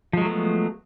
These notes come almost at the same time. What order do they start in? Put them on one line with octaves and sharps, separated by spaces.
F3 G#3 F#3 A3 B3